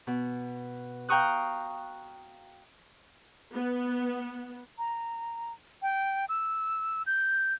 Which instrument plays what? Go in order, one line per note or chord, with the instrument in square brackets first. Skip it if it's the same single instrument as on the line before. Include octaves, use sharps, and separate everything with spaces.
[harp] B2
F5 G5 A#5 C#6 D#6 F#6
[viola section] B3
[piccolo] A#5
G5
E6
G6